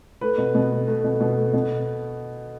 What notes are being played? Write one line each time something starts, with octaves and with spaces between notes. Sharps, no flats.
A3 B4
B2
B2
A3
A3
B2
B2
A3
B2